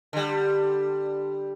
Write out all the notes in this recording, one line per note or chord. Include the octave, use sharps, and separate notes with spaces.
D3 G3